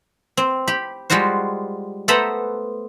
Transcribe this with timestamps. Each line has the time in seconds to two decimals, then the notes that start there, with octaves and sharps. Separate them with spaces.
0.37 C4
0.68 G4 B5
1.10 G3 G#3 F4 F#4 C5
2.08 A3 B3 A4 C5 A#5 B5